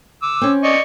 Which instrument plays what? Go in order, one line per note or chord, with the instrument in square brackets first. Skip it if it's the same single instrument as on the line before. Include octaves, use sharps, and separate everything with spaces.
[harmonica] D6 E6
[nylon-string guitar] C4 C#4
[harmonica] D5 D#5 C#6